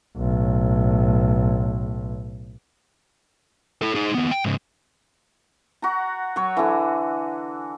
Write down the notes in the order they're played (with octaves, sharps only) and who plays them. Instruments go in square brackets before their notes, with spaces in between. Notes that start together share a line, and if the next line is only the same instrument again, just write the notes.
[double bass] B1 A2
[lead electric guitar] E4 A4
D#4 G#4
D#2 B3
G5
G#2 C#3
[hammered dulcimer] F#4 A#5
F#3 C#5
D3 E3